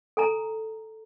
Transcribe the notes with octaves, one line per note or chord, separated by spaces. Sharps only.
A4 G#5 A#5